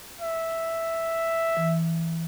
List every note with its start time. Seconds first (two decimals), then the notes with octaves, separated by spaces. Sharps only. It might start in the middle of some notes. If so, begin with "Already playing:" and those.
0.21 E5
1.57 E3